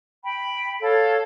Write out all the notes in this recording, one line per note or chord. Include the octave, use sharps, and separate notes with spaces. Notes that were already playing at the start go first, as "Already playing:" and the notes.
G5 B5
A4 C#5 F5